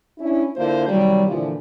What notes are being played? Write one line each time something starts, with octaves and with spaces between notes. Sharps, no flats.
C#4 D4 E4
D3 A#3 E4 F4 C5
C3 D#3 F#3 G3
A#2 D3 E3 F3